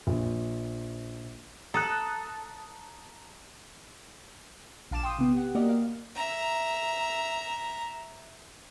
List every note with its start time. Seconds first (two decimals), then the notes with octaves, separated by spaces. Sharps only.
0.07 A#1
1.74 A4 A#5 D#6 F#6
4.91 A#1 F5 A5 D6 E7
5.03 G5 C6 D#6
5.19 C3 B3
5.33 G4 F#5
5.55 A#3 F#4 G4 A#4 D5 D#5
5.69 F5
6.15 E5 A#5